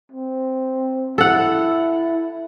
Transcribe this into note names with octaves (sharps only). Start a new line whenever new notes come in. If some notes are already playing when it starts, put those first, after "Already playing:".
C4
E4 A4 F#5